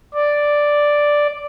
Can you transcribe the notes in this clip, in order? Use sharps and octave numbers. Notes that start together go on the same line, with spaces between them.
D5